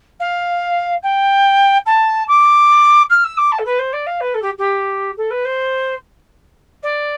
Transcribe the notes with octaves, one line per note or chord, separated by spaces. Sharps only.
F5
G5
A5
D6
F6
E6
D6
A5
A4
B4
C5
D5
F5
B4
A4
G4
G4
A4
B4
C5
D5